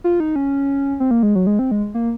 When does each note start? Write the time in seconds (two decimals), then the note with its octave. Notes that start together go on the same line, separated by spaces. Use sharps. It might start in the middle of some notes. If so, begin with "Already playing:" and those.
0.04 F4
0.20 D#4
0.36 C#4
1.00 C4
1.11 A#3
1.23 G#3
1.35 F#3
1.47 G#3
1.59 C4
1.71 G#3
1.94 A#3